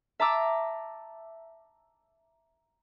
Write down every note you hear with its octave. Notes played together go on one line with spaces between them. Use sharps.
E5 A5 A#5 D6 E6